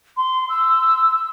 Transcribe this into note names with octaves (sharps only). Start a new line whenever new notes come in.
C6
E6